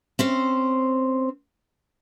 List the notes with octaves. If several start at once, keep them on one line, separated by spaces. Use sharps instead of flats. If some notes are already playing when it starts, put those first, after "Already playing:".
C4 C#4 C5